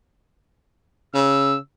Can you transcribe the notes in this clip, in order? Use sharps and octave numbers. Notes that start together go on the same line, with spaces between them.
C#3 E6